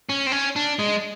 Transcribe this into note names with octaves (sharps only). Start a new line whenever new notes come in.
C#4
C4
C#4
D4
G#3